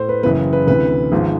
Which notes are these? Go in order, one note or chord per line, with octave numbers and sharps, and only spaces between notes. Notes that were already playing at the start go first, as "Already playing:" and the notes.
Already playing: A2 C5
B4
F#1 F#2 C#3 E3 B4
B4
D2 C3 E3 B4
G#1 G#2 F3